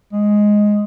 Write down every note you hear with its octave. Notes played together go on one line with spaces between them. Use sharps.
G#3